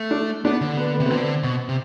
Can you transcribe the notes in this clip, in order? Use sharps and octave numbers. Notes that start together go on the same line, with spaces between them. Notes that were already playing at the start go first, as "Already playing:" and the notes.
Already playing: A3
D4
B3 D4
D3
B3
B3
C3
B3
D3 C4
B2
C3